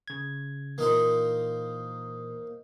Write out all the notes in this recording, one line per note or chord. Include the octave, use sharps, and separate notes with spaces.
C#3 G#6
A#2 E3 A#3 D#4 C5